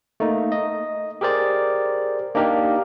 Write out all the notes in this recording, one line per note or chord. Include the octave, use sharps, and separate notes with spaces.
A3 A#3 D#4
D#5
G4 G#4 A#4 C5 D5
A#3 D4 D#4 G4 A#4